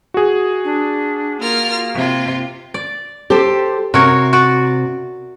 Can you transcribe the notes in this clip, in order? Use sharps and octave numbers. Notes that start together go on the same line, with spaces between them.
F#4 G#4
D4
A#3 F4 A#4 F6
C3 F4
D5
G4 A4 C5
C3 F#4 A#4 C#5
F#4 D5